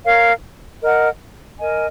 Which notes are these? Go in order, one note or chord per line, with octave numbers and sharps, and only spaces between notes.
A#4 C#5 F5
A#4 D#5 F#5
A#4 D#5 G#5